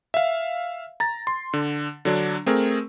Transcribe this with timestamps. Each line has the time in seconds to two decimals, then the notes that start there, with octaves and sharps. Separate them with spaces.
0.14 E5 F5
1.00 A#5 A6
1.27 C6
1.53 D3
2.05 D3 F#3 D4
2.46 A3 C4 G#4 A#4